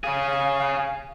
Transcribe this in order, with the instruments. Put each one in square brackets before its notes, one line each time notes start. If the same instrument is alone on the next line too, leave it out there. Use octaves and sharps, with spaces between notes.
[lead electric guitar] C#4 G#4 [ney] F5